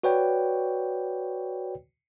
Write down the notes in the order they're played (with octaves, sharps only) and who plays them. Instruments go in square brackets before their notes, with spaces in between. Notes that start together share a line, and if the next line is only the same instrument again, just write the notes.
[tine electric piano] F#4 B4 C#5 D5 G5